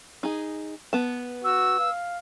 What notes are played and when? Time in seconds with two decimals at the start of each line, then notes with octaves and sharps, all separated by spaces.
0.23 D#4 G#4
0.93 B3 A5
1.44 F#4 E6
1.79 F5